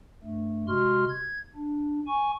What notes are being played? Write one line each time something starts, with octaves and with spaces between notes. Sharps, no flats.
G2 A3
C3 G#3 F#4 C6 F6
G#6
D4
G#5 C#6